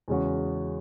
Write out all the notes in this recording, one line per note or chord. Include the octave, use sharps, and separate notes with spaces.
E2 C#3 G#3 C#4 F#4